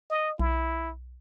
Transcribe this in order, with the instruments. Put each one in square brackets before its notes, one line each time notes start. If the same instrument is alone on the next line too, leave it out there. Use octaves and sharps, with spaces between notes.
[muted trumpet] D#5
[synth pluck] B1 [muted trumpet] E4